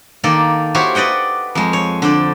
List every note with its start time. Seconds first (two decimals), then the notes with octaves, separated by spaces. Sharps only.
0.24 D#3 A#3 A4 D5
0.75 E4 F#4 G4 C5 C#5
0.95 B4 D5 D#5 F#5 G5
1.55 F2 G#3
1.73 C#5
2.02 D3 C5 D5